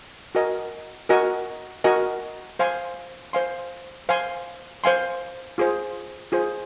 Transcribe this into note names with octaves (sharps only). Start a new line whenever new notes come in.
F#4 A#4 D#5 G#5
F#4 A#4 D#5 G#5
F#4 A#4 D#5 G#5
C5 F5 G#5 C6
C5 F5 G#5 C6
C5 F5 G#5 C6
C5 F5 G#5 C6
F4 G#4 C5
F4 G#4 C5